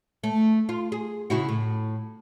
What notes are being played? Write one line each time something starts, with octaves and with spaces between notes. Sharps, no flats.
A3
F4
G#4
C#3 E4 F#4
A2